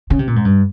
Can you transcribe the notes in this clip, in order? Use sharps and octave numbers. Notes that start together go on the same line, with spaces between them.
C#3
C3
A#2
G#2
G2